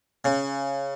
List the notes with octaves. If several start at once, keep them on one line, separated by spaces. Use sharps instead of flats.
C#3